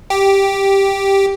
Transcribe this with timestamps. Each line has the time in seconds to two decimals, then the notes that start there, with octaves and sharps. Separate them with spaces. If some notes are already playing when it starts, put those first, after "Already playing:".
0.10 G4